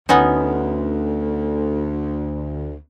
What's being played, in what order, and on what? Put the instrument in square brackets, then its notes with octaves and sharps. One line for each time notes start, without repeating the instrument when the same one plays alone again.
[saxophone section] D2 [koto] B3 C#4 D#4